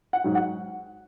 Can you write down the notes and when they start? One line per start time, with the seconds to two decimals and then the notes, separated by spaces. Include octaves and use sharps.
0.13 F#5
0.24 G#2 F#3
0.35 F#5